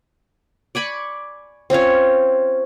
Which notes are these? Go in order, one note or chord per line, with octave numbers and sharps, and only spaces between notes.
D5 G#5 B5 C#6
C4 C#4 F4 C#5